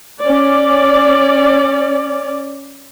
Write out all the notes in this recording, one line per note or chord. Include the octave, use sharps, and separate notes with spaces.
C#4 D5